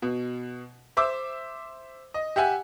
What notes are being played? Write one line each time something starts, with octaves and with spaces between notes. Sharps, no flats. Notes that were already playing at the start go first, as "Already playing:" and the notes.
B2
C5 E5 D6 E6
D#5
G4 E5 F#5 G#5